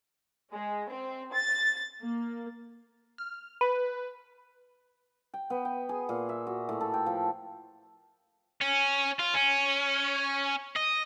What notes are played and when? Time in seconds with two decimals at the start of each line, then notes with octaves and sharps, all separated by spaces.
0.54 G#3
0.90 C4
1.34 A6
2.03 A#3
3.18 F6
3.61 B4
5.34 G5
5.50 B3
5.65 G5
5.89 G#4
6.09 A#2
6.29 E5
6.47 F#4
6.69 A2
6.81 A4
6.94 G5
7.06 F3
8.61 C#4
9.19 F4
9.34 C#4
10.76 D#5